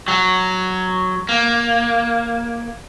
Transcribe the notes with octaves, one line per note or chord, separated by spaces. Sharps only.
F#3
A#3